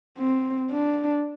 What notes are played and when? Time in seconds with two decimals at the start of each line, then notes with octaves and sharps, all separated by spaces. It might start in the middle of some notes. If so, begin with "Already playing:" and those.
0.18 C4
0.72 D4